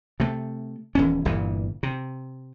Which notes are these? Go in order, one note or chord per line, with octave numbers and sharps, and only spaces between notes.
C3 A3
D#1 E2 C#4
G1 G2 A#2 E3
C3